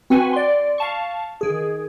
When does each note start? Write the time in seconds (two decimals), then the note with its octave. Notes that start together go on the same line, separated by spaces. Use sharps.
0.10 C4 F#4 B4 F#5 G#5
0.33 D5 C6
0.78 F5 A5 C#6
1.41 D#3 G#4